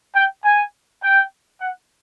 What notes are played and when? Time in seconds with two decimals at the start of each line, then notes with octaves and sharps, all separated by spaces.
0.15 G5
0.44 G#5
1.03 G5
1.60 F#5